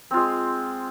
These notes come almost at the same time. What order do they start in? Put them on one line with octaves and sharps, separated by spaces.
C4 F4 G#3